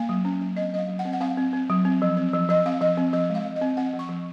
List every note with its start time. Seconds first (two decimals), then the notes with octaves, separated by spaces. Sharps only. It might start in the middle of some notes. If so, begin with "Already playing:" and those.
Already playing: A#3 F5
0.09 F#3
0.25 C#4
0.42 F#3
0.56 C4 D#5
0.74 F#3 D#5
0.78 F5
0.89 F#3
0.99 F#5
1.05 C4
1.13 F#5
1.21 C4 F5
1.37 C4
1.53 C4
1.70 F#3
1.85 C4
2.02 F3
2.17 C4
2.33 F3
2.49 F3 D#5
2.65 C4 F5
2.81 F3 D#5
2.97 C4
3.13 F3 D#5
3.30 G#3
3.35 F5
3.45 F3
3.56 D#5
3.62 C4
3.77 C4 F#5
3.93 F3
3.99 C#6
4.09 F3